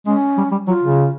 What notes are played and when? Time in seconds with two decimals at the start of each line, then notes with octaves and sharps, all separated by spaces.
0.06 G#3 C#4
0.38 G3
0.52 G3
0.68 F#3 F4
0.83 C#3